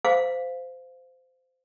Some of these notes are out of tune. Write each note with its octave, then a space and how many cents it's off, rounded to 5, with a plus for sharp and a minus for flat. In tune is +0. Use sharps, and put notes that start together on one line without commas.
C5 -20 F5 +0